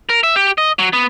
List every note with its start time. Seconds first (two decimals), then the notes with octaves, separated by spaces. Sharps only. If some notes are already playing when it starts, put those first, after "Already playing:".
0.09 A#4
0.23 E5
0.36 G4
0.58 D#5
0.79 F#3
0.93 B3